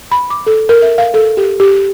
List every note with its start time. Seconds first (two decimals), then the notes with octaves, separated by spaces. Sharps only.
0.11 B5
0.30 D6
0.47 A4
0.69 A#4
0.82 E5
0.98 F5
1.14 A4
1.37 G4
1.60 G4